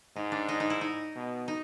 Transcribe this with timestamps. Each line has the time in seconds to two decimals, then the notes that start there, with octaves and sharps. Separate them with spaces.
0.16 G#2 D#4
0.32 D4
0.49 D#4
0.60 D#4
0.70 E4
0.81 D#4
1.15 B2
1.48 D#4